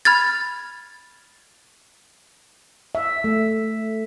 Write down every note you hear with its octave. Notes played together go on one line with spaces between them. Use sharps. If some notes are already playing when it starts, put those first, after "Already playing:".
B5 F6 G#6 A6
E5
A3